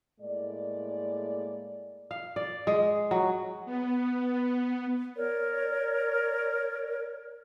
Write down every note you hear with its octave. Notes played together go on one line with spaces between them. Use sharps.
A2 G#3 A#3 D5
F5
D5
G#3
F#3
B3
A#4 C#5 D5